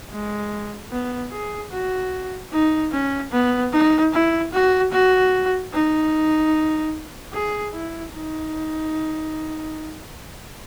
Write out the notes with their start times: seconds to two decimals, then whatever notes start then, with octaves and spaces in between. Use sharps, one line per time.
0.11 G#3
0.91 B3
1.32 G#4
1.71 F#4
2.52 D#4
2.92 C#4
3.32 B3
3.72 D#4
4.13 E4
4.53 F#4
4.92 F#4
5.72 D#4
7.33 G#4
7.73 E4
8.13 D#4